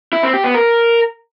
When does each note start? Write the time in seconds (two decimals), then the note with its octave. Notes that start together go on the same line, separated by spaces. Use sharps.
0.13 E4
0.23 C4
0.34 G4
0.44 B3
0.54 A#4